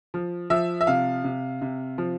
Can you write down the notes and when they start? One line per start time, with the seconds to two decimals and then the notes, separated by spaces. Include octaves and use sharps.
0.14 F3
0.50 F3 E5
0.81 E5
0.87 C3 F5
1.24 C3
1.62 C3
1.98 F3